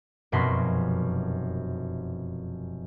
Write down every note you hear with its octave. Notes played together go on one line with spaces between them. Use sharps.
F1 F#2 B2 A#4 B4 C6